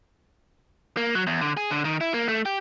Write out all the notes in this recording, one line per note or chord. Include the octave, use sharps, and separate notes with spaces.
A#3
F#3
E2
D3
G#4
D3
D#3
E4
A#3
A3
G4